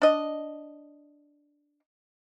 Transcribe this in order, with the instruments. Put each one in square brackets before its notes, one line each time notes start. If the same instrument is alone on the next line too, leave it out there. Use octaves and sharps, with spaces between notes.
[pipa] D4 D#5